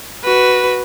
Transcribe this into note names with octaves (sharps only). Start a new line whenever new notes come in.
F#4 B4